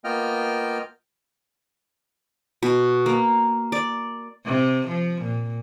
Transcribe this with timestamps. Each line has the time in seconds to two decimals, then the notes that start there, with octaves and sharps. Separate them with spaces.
0.04 A#3 B3 F4 D#5 G5 F6
2.63 B2
3.06 A#3
3.72 D5
4.46 C3
4.88 F3
5.23 A#2